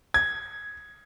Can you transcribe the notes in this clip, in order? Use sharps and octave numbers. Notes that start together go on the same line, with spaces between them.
G#6